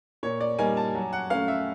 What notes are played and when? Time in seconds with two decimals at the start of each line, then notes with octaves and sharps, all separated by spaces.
0.23 A#2 C#5
0.41 D5
0.59 G3 A#3 D#4 G#5
0.77 A5
0.95 F#3
1.13 F#5
1.30 A3 C#4 F5
1.48 E5